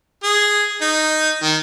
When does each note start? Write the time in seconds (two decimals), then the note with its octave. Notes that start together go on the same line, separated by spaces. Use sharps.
0.23 G#4
0.81 D#4
1.43 D#3